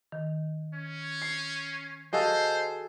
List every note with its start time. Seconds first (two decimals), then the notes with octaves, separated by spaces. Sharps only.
0.12 D#3
0.74 C#4
1.22 C7
2.13 F#4 G#4 A4 C5 D#5 F5